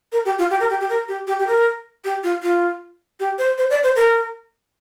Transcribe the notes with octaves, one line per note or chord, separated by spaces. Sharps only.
A#4
G4
F4
G4
A#4
G4
G4
A#4
G4
G4
G4
A#4
G4
F4
F4
G4
C5
C5
D5
C5
A#4